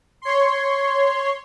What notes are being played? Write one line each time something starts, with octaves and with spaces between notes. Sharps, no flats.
C#5 C6